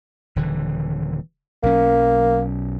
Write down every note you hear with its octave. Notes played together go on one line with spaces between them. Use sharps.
D#1 D3 E3
B1 F#3 A#3 C#4